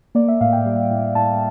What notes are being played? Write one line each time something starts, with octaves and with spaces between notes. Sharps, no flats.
A#3 D5
E5
A2 F5
G5
G3
A2
A2 A5